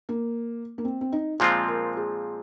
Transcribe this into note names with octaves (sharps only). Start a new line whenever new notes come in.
A#3
A#3
C4
C4
D#4
A#2 F3 G#3 C4 F4 G#4
A#4
G#4